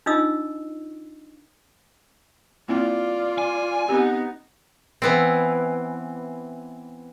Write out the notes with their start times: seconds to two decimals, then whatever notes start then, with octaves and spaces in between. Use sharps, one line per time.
0.06 D4 D#4 F4 D#5 D#6 E6
2.68 A#3 C4 E4 F4 D5
3.38 G#5
3.89 B3 C4 D#4 G4
5.02 E3 B3 C4